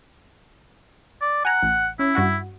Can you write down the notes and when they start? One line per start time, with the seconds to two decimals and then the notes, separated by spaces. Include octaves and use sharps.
1.21 D5
1.45 F#5 G#5 A#5
1.62 A1
1.99 C#4 E4
2.15 G2 F#4 F#5